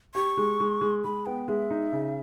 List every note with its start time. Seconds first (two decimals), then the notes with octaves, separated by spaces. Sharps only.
0.15 G4 C#6
0.37 G#3
0.60 G#3
0.81 G#3
1.04 G#3 B5
1.26 B3 G5
1.48 G#3 E5
1.70 D#4
1.92 C#3